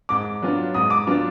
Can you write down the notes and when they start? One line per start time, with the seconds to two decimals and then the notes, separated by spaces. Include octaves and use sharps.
0.09 G#2 D6
0.42 F#3 B3 D4 F4
0.74 G#2 D#6
0.90 D6
1.07 F#3 B3 D4 F4